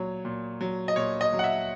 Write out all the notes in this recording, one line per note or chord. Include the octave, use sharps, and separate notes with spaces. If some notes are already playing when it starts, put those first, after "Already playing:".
Already playing: A#2 F#3 C#5
A#2
F#3
D#5
A#2 C#5
D#5
F#3
F#5
E5